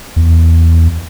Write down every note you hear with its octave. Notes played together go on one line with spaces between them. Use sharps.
E2